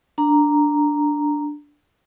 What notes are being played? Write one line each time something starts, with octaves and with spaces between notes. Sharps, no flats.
D4 A#5